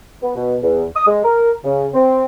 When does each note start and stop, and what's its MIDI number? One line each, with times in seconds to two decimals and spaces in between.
0.22 0.34 59
0.35 0.56 47
0.62 0.84 40
0.95 1.06 87
1.07 1.19 56
1.24 1.51 70
1.64 1.87 49
1.94 2.25 60